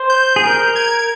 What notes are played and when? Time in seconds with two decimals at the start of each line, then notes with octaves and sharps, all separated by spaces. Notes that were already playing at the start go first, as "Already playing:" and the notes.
Already playing: C5
0.10 G6
0.36 G#4
0.44 A#4
0.76 G#6